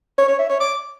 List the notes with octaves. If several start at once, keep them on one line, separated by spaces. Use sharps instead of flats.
C#5
C#5
E5
C#5
D6